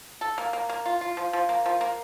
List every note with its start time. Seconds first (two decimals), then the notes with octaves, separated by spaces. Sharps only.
0.21 A4
0.38 A#3
0.53 A#3
0.69 A#3
0.86 F4
1.01 F4
1.17 F3
1.33 F3
1.49 A#3
1.66 F3
1.81 A#3